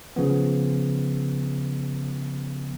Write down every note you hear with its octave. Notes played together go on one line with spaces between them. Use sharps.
C#3 F3 B3